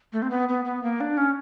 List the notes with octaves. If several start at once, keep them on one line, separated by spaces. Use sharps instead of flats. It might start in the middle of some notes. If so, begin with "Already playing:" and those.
A3
C4
B3
B3
B3
A#3
D4
C#4